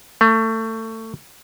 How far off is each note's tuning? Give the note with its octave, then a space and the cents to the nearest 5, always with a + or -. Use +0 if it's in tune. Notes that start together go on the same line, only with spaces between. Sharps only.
A3 +25